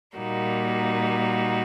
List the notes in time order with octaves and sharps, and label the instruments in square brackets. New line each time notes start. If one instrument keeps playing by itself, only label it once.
[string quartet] A#2 G3 A#3 D#4 F#4